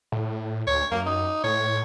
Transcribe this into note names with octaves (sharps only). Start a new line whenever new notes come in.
A2
D2 C#5
F#2 A#3
D#4
A2 C#5